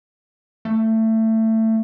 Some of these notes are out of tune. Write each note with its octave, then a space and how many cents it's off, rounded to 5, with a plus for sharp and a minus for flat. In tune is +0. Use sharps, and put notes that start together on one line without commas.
A3 +20